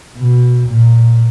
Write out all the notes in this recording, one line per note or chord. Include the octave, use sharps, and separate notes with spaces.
B2
A#2